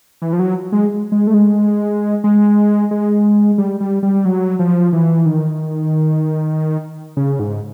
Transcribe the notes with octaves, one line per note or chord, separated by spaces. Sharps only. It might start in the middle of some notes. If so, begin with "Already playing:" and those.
E3
F3
F#3
G#3
G#3
A3
G#3
G#3
G#3
G3
G3
G3
F#3
F3
E3
D#3
C#3
G#2